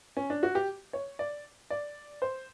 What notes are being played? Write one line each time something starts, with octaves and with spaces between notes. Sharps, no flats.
C#4
D4
F#4
G4
C#5
D5
D5
C5